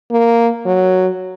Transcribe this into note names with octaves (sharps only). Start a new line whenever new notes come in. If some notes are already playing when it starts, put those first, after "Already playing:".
A#3
F#3